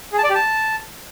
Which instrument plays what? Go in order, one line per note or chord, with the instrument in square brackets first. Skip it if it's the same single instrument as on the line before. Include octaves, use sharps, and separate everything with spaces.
[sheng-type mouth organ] G#4
A5
D5
G4
A5